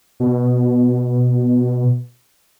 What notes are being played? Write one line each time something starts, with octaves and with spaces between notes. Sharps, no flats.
B2